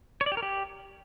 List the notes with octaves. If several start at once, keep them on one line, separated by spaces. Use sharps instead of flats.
C#5
D5
G4
A#4
G4